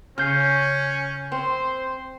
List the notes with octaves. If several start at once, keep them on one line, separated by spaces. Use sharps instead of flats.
C#3 C#4 F6 G6 C7
C4 C5